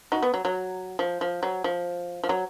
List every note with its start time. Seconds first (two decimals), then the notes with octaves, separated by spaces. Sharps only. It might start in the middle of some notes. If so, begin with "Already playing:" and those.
0.12 D#4 F#4
0.23 B3
0.34 F#3
0.45 F#3
0.99 F3
1.21 F3
1.43 F#3
1.64 F3
2.24 F3
2.29 F#3